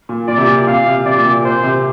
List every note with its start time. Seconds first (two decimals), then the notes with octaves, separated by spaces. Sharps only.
0.09 A#2
0.28 A#2 D5
0.38 C3
0.47 A#2
0.67 A#2 F5
0.86 C3
1.05 C3 D5
1.16 A#2
1.25 C3
1.44 A#2 C5
1.63 C3